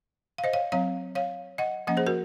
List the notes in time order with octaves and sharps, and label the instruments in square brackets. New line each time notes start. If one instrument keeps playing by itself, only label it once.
[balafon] F5
C5 D#5
C#5 F5
F#3 C4 C#5 F5
C#5 F5
D#5 F#5
F3 A#3 C#4 D#5 F#5
G#4 C5
F#4 A#4